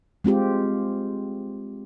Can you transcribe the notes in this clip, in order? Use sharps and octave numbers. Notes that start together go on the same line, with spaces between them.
G#3 C4 F4 G4